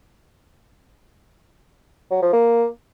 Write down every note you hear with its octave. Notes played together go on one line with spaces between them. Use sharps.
F#3
F3
A#3